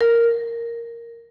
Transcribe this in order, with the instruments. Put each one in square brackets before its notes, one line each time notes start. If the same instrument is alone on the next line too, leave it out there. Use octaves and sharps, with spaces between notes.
[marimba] A#4